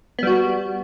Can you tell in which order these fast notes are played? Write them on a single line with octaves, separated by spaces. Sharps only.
B3 G3 F#4